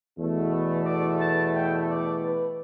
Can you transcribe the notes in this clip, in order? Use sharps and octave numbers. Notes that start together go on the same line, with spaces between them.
E2 B2 A3
B4
D5
A5
G5
D5
B4